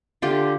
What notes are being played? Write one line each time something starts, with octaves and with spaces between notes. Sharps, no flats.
D3 F4 G4